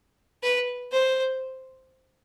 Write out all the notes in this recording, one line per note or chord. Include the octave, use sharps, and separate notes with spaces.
B4
C5